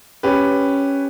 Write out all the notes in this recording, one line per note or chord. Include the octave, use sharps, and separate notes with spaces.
C#4 G4 B4